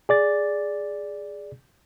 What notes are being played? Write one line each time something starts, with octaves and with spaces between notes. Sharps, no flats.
G#4 D5 A6